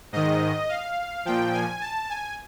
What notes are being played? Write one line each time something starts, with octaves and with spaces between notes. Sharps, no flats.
G#2 D#3 D#5
F5
A#2 F3 G5
G#5
A5
G#5